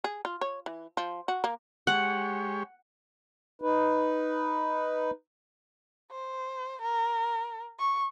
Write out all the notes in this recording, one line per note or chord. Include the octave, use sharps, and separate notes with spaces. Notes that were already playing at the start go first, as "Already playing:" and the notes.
G#4
F4
C#5
E3
F3
F#4
A#3
G#3 G4 C#5 F#5
D#4 B4
C5
A#4
C#6